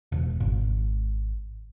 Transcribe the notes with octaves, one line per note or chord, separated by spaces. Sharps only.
E1
G#1